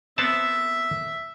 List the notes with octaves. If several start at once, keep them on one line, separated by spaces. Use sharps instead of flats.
B3 C4 E5 A5